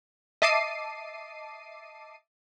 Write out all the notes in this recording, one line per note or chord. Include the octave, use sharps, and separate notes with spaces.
D#5 E5 A5 D6 C7 D#7